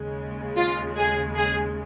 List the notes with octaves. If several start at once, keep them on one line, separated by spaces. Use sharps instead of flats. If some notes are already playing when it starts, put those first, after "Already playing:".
Already playing: D#2 C#3 G#3
F4
G#4
G#4